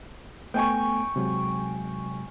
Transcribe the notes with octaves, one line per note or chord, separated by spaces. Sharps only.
A3 B3 G5 G#5 C#6
C3 F#3 G#3